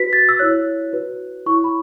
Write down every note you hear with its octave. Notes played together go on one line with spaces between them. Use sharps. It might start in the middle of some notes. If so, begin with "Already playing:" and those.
Already playing: F#4 B4 B6
A6
E6
E4 C#5 F#6
F#4 B4
E4 C#5 C#6
B5